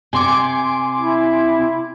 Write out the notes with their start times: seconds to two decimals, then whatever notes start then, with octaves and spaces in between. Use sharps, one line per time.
0.13 C3 G#5 C6 D6
0.98 E4